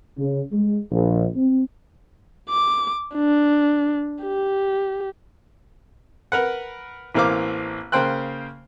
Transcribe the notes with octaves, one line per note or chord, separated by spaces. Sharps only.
C#3
G#3
A#1
C4
D6
D4
G4
A#4 B4 F#5
A1 E3 A#3 C4 F5 D6
C#3 A#3 C5 G5 C6 F#6